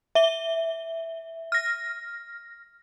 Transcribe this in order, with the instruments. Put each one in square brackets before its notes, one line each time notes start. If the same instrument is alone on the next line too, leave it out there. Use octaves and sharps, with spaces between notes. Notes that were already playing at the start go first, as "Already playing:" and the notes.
[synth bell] E5 G7
F6 A#6